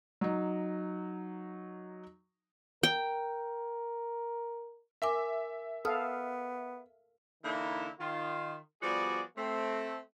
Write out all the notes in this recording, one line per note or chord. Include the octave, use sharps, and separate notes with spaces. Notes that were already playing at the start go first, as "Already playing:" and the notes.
F#3 D#4
A#4 G5
A#4 E5 G#5 D6
B3 A4 F5 D#6 F6
D3 E3 A#3 D#4 E4
D#3 F4
F3 G3 B3 F#4 G#4 D5
A3 C4